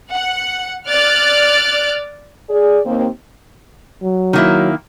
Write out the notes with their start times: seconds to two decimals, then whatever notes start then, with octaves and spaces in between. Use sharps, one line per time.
0.11 F#5
0.89 D5 F6 F#6 A6 D7
2.50 G#4 D5
2.86 D#2 A#3 C4
4.02 F#3
4.33 D#3 A#3 E4